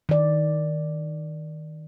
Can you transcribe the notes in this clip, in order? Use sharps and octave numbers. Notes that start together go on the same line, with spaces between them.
D#3 D5